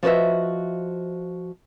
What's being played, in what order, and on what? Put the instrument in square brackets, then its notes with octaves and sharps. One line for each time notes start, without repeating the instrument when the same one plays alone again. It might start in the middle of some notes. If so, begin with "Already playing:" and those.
[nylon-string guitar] F3 F#4 B4 D#5 E5